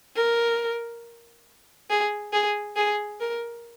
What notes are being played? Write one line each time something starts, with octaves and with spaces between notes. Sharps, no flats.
A#4
G#4
G#4
G#4
A#4